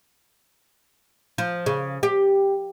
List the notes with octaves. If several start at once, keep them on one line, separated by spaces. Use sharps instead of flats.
F3
C#3
G4